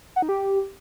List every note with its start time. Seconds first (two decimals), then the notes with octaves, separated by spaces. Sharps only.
0.16 F#5
0.22 D#4
0.29 G4